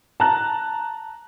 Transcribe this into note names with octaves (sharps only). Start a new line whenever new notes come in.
A5 A#5 F#6